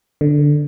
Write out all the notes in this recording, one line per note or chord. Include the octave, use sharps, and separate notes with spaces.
D3